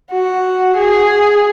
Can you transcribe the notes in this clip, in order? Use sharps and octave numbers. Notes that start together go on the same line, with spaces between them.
F#4
G#4